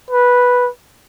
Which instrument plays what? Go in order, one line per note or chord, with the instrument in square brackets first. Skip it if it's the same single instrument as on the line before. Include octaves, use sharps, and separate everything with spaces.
[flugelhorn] B4